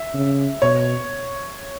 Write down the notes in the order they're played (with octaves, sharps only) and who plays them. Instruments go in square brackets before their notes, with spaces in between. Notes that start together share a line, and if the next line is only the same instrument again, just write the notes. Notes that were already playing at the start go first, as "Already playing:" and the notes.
Already playing: [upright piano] E5
[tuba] C#3
[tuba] B2 [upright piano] C#5